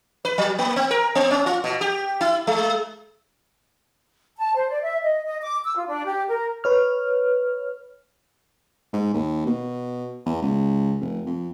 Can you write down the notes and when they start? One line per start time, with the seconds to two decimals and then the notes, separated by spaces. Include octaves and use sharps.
0.25 B4
0.38 F#3
0.59 A#3
0.76 C4
0.91 A#4
1.15 B3
1.31 C#4
1.46 F4
1.64 B2
1.81 G4
2.21 E4
2.47 G#3
4.37 A5
4.54 C5
4.69 D5
4.82 E5
5.02 D#5
5.24 D#5
5.42 D6
5.64 E6
5.76 F4
5.88 D4
6.04 G4
6.28 A#4
6.64 B4 C#5 F6
8.93 G#2
9.14 D#2
9.46 B2
10.26 E2
10.42 C#2
11.01 F1
11.26 F2